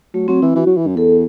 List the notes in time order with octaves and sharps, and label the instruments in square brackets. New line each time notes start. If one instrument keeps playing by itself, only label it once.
[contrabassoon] F#3 [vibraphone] A3
[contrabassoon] F#3 [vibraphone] C4
[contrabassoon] E3 [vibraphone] E4
[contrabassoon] E3 [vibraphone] F#4
[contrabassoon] F#3
E3
F#2
[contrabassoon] E2 [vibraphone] A4